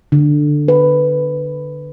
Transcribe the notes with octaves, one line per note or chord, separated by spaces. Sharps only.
D3
B4